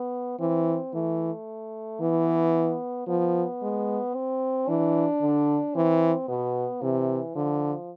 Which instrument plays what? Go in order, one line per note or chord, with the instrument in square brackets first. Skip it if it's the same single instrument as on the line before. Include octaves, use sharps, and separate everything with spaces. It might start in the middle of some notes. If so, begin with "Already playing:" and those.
Already playing: [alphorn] B3
[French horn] E3 [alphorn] C4
[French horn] E3 [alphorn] A3
[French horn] E3 [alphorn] B3
[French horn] F3 [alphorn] B3
[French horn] G#3
[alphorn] C4
[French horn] E3 [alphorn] D4
[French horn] D3
[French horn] E3 [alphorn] C4
[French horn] B2 [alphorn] B3
[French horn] C3 [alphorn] E3
[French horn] D3 [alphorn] F3